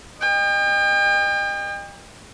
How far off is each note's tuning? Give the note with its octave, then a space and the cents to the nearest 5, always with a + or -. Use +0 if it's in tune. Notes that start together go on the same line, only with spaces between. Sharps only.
D#5 -30 G5 +35